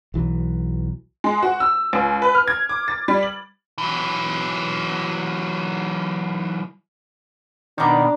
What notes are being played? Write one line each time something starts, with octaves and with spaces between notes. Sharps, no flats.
B1 E3 F#3
G#3
F#4
E6
C#2
B4
F6
G#6
D6
A6
G3
F#7
E3 F#3
B2 D#3 D4 D5 A#5